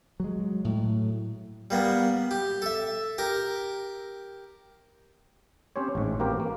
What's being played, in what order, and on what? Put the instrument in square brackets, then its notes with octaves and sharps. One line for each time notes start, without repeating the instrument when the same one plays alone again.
[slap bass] F#3 G#3
A2 F#3
[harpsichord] G3 A#3 B3
G4
A4 E5
G4 A#4
[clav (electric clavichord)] C4 C#4 G4 C5 C#5
A1 G#2
A#3 C4 F#4 G4 A#4 B4
A#3